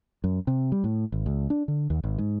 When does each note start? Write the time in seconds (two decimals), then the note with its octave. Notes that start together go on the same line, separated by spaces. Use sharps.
0.24 F#2
0.47 C3
0.72 G3
0.84 A2
1.12 G#1
1.26 C#2
1.50 D4
1.68 D3
1.90 D#2
2.04 G#1
2.18 G#2